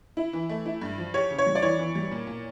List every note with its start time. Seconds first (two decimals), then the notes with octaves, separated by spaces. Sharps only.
0.17 E4
0.33 E3
0.49 A3
0.66 E4
0.82 G2
0.98 F3
1.14 G4 C#5
1.31 C#3
1.38 C#5
1.46 G3
1.55 D5
1.62 E3 C#5
1.79 E3
1.95 G3
2.11 A#2
2.27 A#2